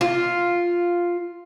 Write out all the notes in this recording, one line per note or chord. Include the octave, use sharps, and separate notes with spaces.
F4